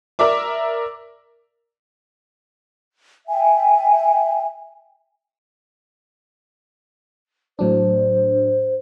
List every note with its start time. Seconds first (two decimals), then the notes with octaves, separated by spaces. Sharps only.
0.19 A#4 D5 E5 D6
3.28 E5 G5 G#5
7.59 A2 F#3 D4 C5